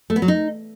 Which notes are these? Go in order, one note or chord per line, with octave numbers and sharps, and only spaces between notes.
A3
B3
F#3
D#4